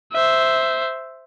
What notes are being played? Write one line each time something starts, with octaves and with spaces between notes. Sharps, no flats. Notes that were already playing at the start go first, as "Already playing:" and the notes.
C5 E5